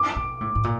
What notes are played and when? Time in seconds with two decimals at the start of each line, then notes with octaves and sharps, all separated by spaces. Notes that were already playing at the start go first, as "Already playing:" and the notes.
Already playing: D6
0.16 B2
0.41 A2
0.55 A2
0.64 A#2